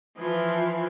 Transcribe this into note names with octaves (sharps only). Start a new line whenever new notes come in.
E3 F3